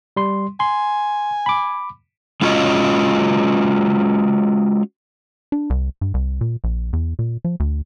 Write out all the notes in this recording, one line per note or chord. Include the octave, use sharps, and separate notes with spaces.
G3 C6
G#5 C6
B5 D6
G#3 C#4 F4 F#4 B4 D#5
D4
C2
G2
C2
A#2
A#1
E2
A#2
F3
D2